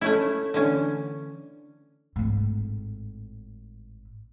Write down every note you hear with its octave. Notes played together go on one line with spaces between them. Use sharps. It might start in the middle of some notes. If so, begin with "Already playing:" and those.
A3 C#4 E4
D3 E3 C#4
G#1 A2